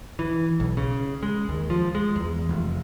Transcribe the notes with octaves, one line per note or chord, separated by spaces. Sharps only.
E3
B1
C#3
G#3
D#2
F3
G#3
E2
F1